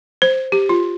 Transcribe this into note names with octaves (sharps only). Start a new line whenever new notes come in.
C5
G4
F4